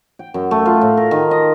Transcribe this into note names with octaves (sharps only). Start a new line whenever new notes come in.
G5
F#2
A3
F4
A2
A#4
D#3
D#5